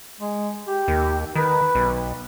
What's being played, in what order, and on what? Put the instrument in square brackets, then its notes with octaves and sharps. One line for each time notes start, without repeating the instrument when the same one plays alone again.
[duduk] G#3
G4
[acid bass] D#2
[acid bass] D#3 [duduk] B4
[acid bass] B1